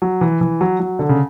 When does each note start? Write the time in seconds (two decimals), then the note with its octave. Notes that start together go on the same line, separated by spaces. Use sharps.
0.02 F#3
0.21 E3
0.41 E3
0.61 F#3
0.80 F#3
0.99 D3
1.09 C#3